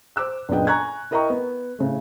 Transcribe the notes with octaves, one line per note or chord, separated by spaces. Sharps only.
C5 D6 E6 F#6
F#1 A#2 B3 D4 D#5 G5
G#5 A#5 C#6 F#6 G#6
E4 A#4 D#5 G5 A#5 C#6
B3
A2 C#3 A3